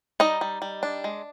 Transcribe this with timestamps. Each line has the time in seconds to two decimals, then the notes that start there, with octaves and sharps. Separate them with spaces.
0.20 G3 D#4 D#5
0.41 G3
0.62 G3
0.83 D4
1.04 G#3